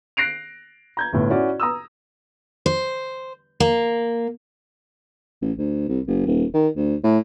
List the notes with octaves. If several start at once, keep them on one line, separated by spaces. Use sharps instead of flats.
F#6 A#6 C7 D7 F7
A#5 G6 G#6
G1 A2
C#4 E4 F#4 D5
A#5 D#6 E6
C5
A#3
A1
D2
C2
F#1
D#1
D#3
D2
A2